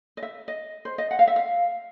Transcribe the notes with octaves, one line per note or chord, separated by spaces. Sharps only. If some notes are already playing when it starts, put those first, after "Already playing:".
D#5
E5
D#5
C5
D#5
F#5
F5
E5
F5